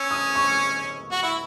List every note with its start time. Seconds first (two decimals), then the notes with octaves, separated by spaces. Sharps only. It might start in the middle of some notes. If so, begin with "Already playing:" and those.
Already playing: C#4 E6
0.11 D#6
0.35 C#6
1.12 F#4
1.23 E4